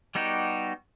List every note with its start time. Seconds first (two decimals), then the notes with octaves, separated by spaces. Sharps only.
0.15 G3 B3 D#4 F#4 G4